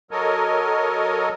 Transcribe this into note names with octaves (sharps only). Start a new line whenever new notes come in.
F#3 A4 A#4 C#5 D#5